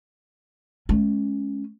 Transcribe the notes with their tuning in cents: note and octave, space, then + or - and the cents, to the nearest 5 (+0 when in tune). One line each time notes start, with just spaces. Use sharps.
G#3 +25 C#4 +0